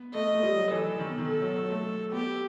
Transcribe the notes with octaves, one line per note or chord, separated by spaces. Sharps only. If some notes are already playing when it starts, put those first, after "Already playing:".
Already playing: B3
A3 D#5
A3
G3
F#3
E3 A4
E3
D#3
B2
D#3
A4
F#3
F#3
A3
B3 G4